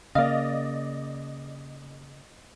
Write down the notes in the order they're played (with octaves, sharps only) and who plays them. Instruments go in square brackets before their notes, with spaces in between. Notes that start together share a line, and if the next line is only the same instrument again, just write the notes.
[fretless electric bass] C#3 A#3 [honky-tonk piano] D5 D#5 [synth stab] F5